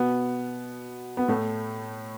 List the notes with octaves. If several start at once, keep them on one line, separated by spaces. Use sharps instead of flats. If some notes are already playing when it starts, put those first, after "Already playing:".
Already playing: B2 B3
B3
A2 A3